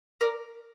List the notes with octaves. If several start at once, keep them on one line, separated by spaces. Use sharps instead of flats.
A#4 D5